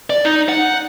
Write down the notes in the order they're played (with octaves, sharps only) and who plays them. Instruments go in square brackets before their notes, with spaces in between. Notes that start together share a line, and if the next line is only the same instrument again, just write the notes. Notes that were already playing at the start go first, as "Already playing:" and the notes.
[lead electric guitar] D5
D#4
F#5